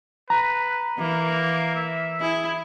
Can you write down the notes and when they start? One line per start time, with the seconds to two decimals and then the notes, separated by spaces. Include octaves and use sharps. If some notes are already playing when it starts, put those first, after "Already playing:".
0.30 B4 A#5
0.98 E3 A#3
1.75 E5
2.21 E4 G#4